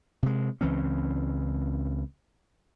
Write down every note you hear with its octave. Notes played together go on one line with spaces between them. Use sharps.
C3 G#3
C#2 E3 C4 C#4